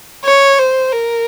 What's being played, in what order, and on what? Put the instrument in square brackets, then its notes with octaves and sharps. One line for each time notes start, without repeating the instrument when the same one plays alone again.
[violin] C#5
C5
A#4